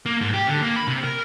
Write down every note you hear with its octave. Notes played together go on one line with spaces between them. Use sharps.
A#3
G#2
G4
D3
A#3
B5
C3
A#4